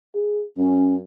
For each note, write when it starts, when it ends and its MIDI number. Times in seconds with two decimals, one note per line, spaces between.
0.15 0.44 68
0.57 1.02 42
0.57 0.96 61